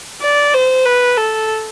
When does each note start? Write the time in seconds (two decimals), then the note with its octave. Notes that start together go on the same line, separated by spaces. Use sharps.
0.22 D5
0.54 C5
0.86 B4
1.17 A4